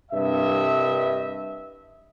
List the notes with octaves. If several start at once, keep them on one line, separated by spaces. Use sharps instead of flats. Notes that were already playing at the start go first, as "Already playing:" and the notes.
C2 G2 D#5 E5